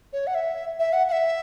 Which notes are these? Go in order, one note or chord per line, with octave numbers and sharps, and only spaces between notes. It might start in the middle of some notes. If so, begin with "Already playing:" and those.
C#5
F#5
E5
E5
F#5
F#5
E5